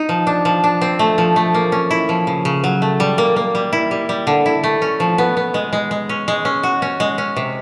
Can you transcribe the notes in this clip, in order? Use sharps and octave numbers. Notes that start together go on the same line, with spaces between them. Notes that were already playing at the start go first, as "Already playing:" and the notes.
Already playing: D#4
F3
D4
F3
D4
C4
A3
F3
A3
A#3
C#4
E4
F3
C#3
C#3
F#3
A3
G3
A#3
A#3
G3
E4
G3
G3
D3
E4
A3
C#4
F3
B3
B3
G#3
G#3
G#3
C#4
G#3
C#4
F#4
C#4
G#3
C#4
C3